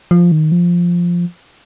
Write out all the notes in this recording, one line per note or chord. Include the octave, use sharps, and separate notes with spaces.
F3
D#3
F3